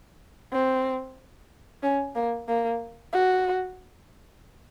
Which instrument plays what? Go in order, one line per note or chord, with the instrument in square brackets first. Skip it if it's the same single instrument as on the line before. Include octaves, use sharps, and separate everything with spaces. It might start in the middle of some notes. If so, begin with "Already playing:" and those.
[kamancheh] C4
C#4
A#3
A#3
F#4